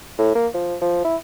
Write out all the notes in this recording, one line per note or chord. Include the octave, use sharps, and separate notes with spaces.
A2
A#3
F3
F3
E4